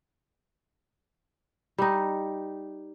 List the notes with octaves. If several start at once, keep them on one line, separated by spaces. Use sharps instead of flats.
G3 D#4